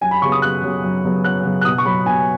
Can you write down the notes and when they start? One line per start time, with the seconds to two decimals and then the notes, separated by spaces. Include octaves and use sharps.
0.01 F#2 G#5
0.11 B5
0.22 C#3 F#3 B3 C#6
0.32 D#6
0.42 F#2 F#6
0.63 C#3 F#3 B3
0.83 F#2
1.04 C#3 F#3 B3
1.24 F#2 F#6
1.45 C#3 F#3 B3
1.61 F#6
1.65 B2 D#6
1.78 C#6
1.86 F#3 B3 B5
2.06 B2 G#5